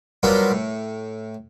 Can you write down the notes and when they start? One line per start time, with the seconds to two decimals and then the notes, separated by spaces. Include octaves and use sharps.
0.23 F#3 G3 A#3 B3 D4 F4
0.51 A2